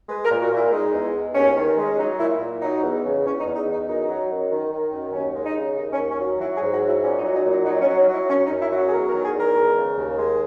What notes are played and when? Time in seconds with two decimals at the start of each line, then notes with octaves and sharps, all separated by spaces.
0.09 G#3 B4
0.24 A#4
0.30 A#2
0.40 F#4
0.51 A#2 E4
0.71 G#3 D#4
0.93 E2
1.14 E2
1.35 D#2 C#4
1.56 D#3
1.77 G#3
1.98 F#3 D#4
2.18 A#2 E4
2.40 A#2
2.61 F#3 D#4
2.82 E2
3.04 C#3
3.24 E2 C#4
3.40 D#4
3.45 E2
3.56 D#4
3.66 E2
3.71 D#4
3.87 F#2 D#4
4.08 F#3
4.30 F#2
4.50 D#3
4.71 D#3
4.92 F#2
5.13 D#2 C#4
5.34 G#3
5.45 D#4
5.56 C#3
5.76 D#2 D#4
5.92 C#4
5.97 D#2
6.09 C#4
6.19 F#3
6.39 F#3 E4
6.55 G#4
6.61 G#2
6.71 F#4
6.82 F#3 E4
7.02 A#2 C#4
7.18 D#4
7.23 F#3
7.35 D#4
7.45 A#2
7.50 D#4
7.65 F#3 D#4
7.81 C#4
7.87 F#3
7.97 D#4
8.08 F#3 E4
8.29 F#2 C#4
8.45 D#4
8.50 F#2
8.60 E4
8.71 F#3
8.76 F#4
8.87 G#4
8.92 E2 A#4
9.08 A#4
9.13 D#3
9.23 G#4
9.34 E2 A#4
9.55 G#3
9.76 C#3
9.97 D#2
10.18 G#3